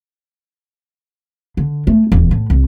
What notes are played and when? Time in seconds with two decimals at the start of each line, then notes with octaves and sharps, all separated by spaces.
1.57 D3
1.87 A3
2.12 D#1 E2
2.31 A2
2.50 C2